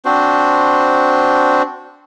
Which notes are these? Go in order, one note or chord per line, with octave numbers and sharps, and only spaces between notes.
C4 D4 F#4 C5